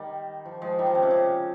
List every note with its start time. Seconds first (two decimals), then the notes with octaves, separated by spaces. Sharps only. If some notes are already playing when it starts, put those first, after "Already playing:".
Already playing: D#3 G3
0.45 F3
0.62 F3 G#3
0.79 D#3 G3
0.86 F3
0.95 C#3
1.02 C3
1.11 C#3